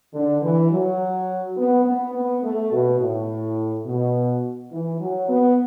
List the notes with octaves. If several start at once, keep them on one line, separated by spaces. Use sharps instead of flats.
D3
E3
F#3
B3
B3
B3
A3
B2
A2
B2
E3
F#3
B3